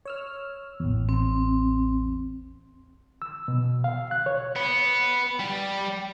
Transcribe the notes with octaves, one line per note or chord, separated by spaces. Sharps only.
C#5 E6 F6
A1 E2
C4
E6
B2
F5
F#6
C#5
B3
G3